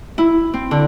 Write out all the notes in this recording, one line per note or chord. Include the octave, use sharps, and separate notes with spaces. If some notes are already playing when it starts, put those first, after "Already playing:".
E4
C4
D3